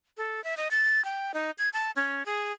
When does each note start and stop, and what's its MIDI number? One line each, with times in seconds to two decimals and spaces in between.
0.17 0.43 69
0.44 0.55 76
0.57 0.68 75
0.71 1.03 93
1.05 1.32 79
1.34 1.51 63
1.58 1.69 92
1.73 1.91 81
1.96 2.25 61
2.26 2.52 68